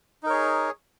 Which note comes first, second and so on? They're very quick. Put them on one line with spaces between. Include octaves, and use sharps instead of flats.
D#4 A#4 C#5 G#4